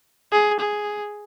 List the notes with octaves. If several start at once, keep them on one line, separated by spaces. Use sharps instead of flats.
G#4
G#4